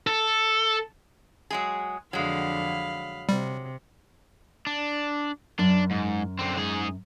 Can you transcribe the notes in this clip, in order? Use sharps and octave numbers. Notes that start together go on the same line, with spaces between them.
A4
F#3 G#3 G#4
F2 D3 F#3 G#3 F5 B5
C3 G3
D4
F#2 D4
G#2
D3 C4
G#2 G#4